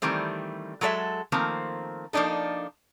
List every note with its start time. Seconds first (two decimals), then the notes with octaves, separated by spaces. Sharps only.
0.02 D#3 E3 G3 A3 C4
0.81 F#3 G#3 A4 C#5 E5
1.32 D#3 F3 A3 A#3 C4
2.13 F3 A#3 D4 D#4 A4